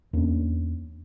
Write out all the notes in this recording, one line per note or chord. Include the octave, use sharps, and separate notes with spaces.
E2 A#3 C#4 D4